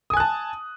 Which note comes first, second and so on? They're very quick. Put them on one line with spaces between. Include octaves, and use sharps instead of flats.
D#6 G#5 F#6 A5